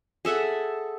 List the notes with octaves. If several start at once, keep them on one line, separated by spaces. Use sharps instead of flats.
G#4 A4 E5 F#5